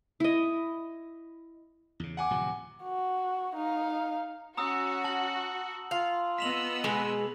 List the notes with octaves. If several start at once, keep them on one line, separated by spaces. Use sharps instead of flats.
E4 D#5
E2 C#3
F#5 G#5 D6
D1 C3 F3
F#4
D#4 F5
C#4 F#4 A#5 D#6 E6
A5 F#7
F4 F5
B3 D#5 E6 B6 F7 F#7
B2 G#3 G#5